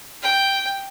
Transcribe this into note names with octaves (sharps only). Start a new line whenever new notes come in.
G5